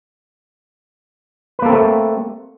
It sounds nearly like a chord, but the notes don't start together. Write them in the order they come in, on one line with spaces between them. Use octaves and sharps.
B4 A#3 A4 C4 A3